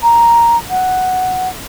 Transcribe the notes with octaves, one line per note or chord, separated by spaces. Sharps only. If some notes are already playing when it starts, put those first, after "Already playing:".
A#5
F#5